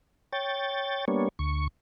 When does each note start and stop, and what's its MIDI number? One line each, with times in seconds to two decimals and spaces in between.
0.33 1.05 73
0.33 1.05 79
0.33 1.05 93
1.08 1.29 55
1.08 1.29 58
1.08 1.29 59
1.08 1.29 62
1.08 1.29 73
1.39 1.68 38
1.39 1.68 85